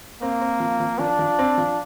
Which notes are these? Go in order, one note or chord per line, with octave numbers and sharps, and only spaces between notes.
A#3 C4
C4
F3
F3
F3 D4
F3
C4
F3